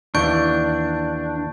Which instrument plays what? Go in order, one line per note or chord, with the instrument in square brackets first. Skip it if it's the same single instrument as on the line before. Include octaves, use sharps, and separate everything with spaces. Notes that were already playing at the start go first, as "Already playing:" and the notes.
[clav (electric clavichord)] D#2 E3 [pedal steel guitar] D4 [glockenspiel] C#6 G6 D7